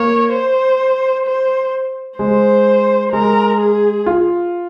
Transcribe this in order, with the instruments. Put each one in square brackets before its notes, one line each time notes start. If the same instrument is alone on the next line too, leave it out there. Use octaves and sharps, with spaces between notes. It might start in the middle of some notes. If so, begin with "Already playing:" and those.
Already playing: [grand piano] A#3 [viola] C#5
[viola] C5
C5
[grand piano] G#3 [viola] C5
[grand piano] G#3 [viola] A#4
[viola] G#4
[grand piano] F4